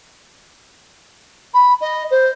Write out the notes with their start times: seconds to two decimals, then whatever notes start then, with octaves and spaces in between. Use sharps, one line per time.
1.53 B5
1.80 D#5
2.10 C5